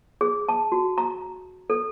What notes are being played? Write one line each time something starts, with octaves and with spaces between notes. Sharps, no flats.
G#4
A5
F#4
A#5
A4